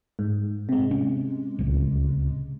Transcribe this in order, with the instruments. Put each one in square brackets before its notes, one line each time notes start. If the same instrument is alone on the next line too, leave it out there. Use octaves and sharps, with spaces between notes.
[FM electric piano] G#2
C3 G#3
[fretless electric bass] C#4
D1 C#2